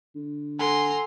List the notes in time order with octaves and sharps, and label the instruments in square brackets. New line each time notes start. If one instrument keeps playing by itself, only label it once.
[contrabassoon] D3
[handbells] A4 F#5 G#5 [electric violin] A#5 C6